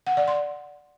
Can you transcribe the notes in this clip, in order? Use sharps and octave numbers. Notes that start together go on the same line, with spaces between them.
F#5
D5
C6